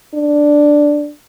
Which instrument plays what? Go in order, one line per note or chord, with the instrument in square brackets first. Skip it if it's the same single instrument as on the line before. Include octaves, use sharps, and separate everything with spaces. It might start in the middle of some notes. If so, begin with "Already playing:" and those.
[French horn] D4